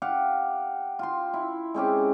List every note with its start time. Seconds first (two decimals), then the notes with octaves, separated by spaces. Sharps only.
0.02 G4 F5 F#5
0.99 F4 G5 C6
1.34 E4
1.74 G#3 C4 C#4 G4